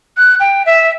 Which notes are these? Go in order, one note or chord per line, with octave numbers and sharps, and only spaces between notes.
F#6
G5
E5